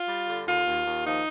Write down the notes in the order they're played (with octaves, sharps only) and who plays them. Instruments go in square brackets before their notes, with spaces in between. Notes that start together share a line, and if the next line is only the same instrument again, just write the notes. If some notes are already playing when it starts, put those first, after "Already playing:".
Already playing: [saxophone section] F4
G3
D3
D#2 F4
D#2
D#2
F3 D#4